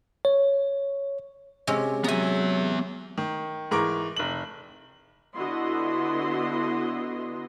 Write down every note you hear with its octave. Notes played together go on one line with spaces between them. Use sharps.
C#5
C3 G#3 C#4
F#3 B3 E5 G#5 A#5
D#3
G#2 E3 A#4 C#6 D6
F1 F#7
D3 B3 E4 F#4 D#5 C6